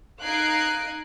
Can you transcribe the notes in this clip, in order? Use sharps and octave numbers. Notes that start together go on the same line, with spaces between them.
D#4 F5 F#6 G#6 C7 D7